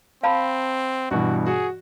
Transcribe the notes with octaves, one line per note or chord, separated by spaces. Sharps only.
C4 F5 A5 B5
G2 B2 E3 F#4
F#4 G#4